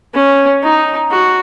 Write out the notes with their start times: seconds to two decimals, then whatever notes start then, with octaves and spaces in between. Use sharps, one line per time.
0.14 C#4
0.63 D#4
1.11 F#4